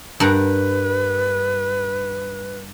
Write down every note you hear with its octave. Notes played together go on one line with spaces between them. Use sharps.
G2 A#4 B4 F#5